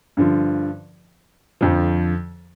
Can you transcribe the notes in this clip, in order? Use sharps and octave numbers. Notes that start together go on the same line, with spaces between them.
G2 D3 F3
F2 D3 F3